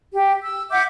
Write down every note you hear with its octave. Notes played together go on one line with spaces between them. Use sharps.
G4
E6
E5 F#5 D6 G6